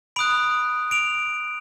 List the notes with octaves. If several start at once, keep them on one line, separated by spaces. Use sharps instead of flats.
B5 D#6 F#6 D7 F7
D7 F7